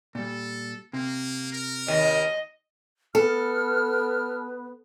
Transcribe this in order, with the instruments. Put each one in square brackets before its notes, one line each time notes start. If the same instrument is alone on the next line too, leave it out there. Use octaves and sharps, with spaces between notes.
[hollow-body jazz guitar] A#2 G3 [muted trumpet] A4
[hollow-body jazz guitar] C3 [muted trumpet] A#3
[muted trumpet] A#4
[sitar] D#2 [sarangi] D#5
[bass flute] B3 [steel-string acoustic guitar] A4 [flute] F6